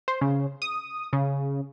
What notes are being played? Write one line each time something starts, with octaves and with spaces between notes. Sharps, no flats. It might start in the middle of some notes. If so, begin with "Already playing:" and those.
C5
C#3
D#6
C#3